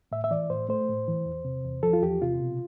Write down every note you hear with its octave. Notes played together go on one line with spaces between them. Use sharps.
A2 E5
E5
E3 D5
A2 C5
A3 C5
A2
E3
E2
C3
E2
F3 A4
F4
E2 G4
C3 F4
B2